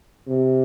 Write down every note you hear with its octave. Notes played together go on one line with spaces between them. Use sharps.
C3